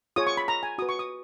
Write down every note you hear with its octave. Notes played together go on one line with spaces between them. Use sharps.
F4 G#4 C#5 D#6
C#6
B5
A#5
G#5
F#4 B4 D#6
C#6
D#6